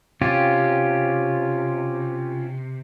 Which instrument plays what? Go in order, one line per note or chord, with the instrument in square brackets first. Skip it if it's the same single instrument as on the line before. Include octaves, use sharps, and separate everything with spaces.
[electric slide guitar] C3 [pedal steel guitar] C#4 F4 G4